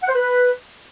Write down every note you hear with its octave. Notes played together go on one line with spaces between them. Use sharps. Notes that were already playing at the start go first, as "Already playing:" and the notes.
F#5
C5
B4